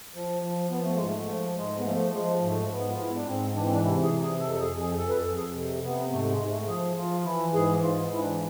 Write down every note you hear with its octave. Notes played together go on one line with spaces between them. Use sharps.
F3
F3
F3 B3
A3
G#2 G#3
A3
F3
G#2 G#3
B3
F3 A3
F3 G#3
G#2 A3
G#2 B3
F4
G#2 E4
D4
G#2 C4
E3 D4
C4
D4
C3 E4
G#4
C3
G#4
F2 A4
A4
G#4
F2
G#4
F2 A4
B4
A4
F2
G#4
C3
C3 B3
G#2 A3
G#3
G#2
A3
F3 G#4
F3 F4
E3 E4
G#2 G#4
G#2 F4
E3 E4
D4